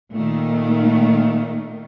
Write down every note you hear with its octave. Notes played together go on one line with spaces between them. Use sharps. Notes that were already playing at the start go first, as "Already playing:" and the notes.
A#2 D#3 A3